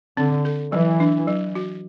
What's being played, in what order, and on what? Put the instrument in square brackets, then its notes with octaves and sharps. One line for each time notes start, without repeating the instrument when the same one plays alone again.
[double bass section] D3 [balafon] C4
[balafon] A4
[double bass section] E3 [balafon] F#3
[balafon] D4
F#3
F#4